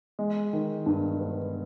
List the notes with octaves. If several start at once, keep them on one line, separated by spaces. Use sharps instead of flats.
G#3
D#3
G2
B3